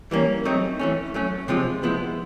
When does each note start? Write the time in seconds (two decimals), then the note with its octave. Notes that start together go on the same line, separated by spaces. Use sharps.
0.11 E3 G3 A#3 C#4
0.45 F#3 A3 C4 D#4
0.79 E3 A3 C#4
1.14 F#3 A3 C#4
1.48 C3 F3 G#3 C4 F4
1.83 F3 G#3 B3 E4